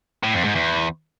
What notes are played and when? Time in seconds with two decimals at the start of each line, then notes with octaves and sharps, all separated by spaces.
0.24 A2
0.34 F2
0.45 G#2
0.55 E2